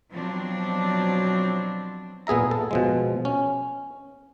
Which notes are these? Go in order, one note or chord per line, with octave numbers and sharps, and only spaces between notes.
B2 F3 F#3 C4 D4
A#2 B3 G#4 E5 A#5
A4
B2 F3 G#3
C#4